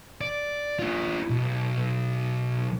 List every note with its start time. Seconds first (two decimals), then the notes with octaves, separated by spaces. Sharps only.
0.21 D5
0.79 D4 F4
1.30 B1